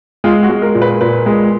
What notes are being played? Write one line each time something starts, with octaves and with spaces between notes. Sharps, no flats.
G#3 F4
F#4
G#3
A#4
A#2
B4
A#2 B4
G#3